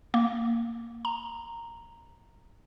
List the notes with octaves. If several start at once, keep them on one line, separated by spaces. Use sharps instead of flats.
A#3
A#5